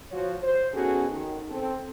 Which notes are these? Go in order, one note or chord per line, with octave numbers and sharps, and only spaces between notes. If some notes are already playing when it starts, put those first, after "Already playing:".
F3 F#4 C#5
C5
B3 C#4 D#4 F#4 G#4 A4
D#3
C4 A4